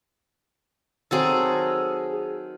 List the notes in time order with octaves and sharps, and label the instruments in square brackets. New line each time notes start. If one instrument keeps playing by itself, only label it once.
[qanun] D#3 F#3 C4 [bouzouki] G#4 A4